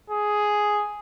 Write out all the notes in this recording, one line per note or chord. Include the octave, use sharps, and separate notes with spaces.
G#4